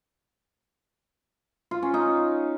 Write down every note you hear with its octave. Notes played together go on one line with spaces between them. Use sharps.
F4
C#4
D#4